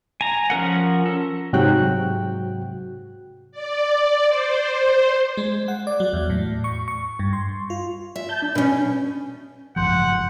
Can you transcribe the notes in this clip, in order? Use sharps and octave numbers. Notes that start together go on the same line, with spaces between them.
G#5 A#5
F3 C#4 A#4 F#5
A4
G#2 C3 F#3 F#4 G5 F#6
D5
C5
C5
G#3
F#5
D5
F#3
E2
A2
C#6
C#6
G2
C6
F4
E5
A5 G6
D4
B2 C#4
F#1 G#2 F3 F#5 C6 G6